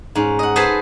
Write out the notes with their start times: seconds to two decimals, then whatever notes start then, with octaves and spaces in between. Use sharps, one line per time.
0.15 G#2 C#4
0.39 D#5 F#5
0.56 G#4 A4 B4 C5 G#5 A5